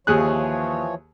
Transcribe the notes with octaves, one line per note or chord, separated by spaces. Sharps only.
D#2 E3 F3 G#4 C#5 F#6